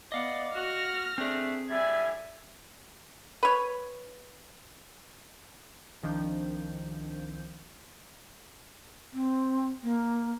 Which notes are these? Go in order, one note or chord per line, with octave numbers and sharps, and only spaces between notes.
B3 D5 D#5 F5 F#5
F#4 F6 A#6
A3 C4 D4 G#4
A2 D3 G3 E5 G#5 G#6
B4 C#5
C2 D#3 F3 D4 G6
C4
A#3